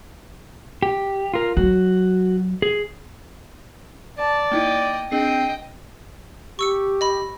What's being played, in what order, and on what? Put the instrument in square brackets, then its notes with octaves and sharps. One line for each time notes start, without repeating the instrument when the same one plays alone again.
[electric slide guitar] G4
F4 A#4
[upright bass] F#3 [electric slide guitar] F#4
[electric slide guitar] G#4
[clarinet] D5 [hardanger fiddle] A5
[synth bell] A#3 D#4 E4 [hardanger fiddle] D#5 G5
[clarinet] C4 [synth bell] D4 G#4 C7 [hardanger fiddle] D#5 G5
[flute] G4 [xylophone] C#6 E6 C#7
[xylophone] D#5 B5